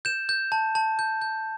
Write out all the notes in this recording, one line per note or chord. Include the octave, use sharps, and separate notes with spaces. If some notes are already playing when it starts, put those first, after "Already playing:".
G6 E7
G6
A5
A5
G6
G6